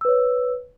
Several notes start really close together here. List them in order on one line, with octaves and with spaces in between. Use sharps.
E6 B4 C#5